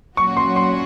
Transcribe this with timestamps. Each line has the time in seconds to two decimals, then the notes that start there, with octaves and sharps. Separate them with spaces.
0.17 A#2 F#3 C#4 F#4 C#6
0.37 C6
0.56 C6